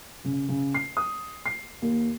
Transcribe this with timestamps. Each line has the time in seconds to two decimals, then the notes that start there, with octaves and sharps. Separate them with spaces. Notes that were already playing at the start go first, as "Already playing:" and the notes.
0.24 C#3
0.48 C#3
0.74 C7
0.97 D#6
1.46 C7
1.82 D#2